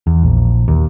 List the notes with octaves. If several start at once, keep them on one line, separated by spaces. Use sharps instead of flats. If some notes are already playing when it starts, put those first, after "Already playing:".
E2
A#1
D#2